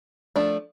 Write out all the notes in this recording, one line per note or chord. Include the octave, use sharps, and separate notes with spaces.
F3 A3 D4